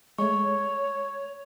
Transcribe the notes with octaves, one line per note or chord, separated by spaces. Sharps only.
G#3 A3 C#5 C#6